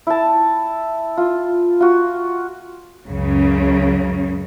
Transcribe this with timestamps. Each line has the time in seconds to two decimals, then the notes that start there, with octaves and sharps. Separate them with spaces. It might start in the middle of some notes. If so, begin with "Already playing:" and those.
0.07 E4 A5
1.17 F4
1.80 F4 F#4
3.08 C#2 F#2 C#3